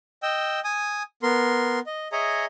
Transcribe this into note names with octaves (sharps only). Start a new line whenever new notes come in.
D#5 G5 E6
G#5 D#6
B3 A#4 C6
D#5
G#4 C#5 D#5 E5 G#5 A#5